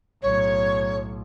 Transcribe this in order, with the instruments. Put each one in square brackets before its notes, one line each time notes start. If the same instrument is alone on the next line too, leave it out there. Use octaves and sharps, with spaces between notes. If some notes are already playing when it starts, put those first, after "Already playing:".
[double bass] B1 A2 [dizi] C#5